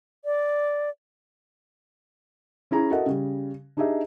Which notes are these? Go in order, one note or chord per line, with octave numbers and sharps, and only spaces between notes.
D5
C#4 E4 G#4 A#5
F#4 A4 A#4 D#5 E5 F#5
C#3 G3
D4 D#4 G4 G#4 D#5 E5